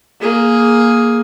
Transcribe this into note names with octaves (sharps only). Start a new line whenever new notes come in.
A#3 G#4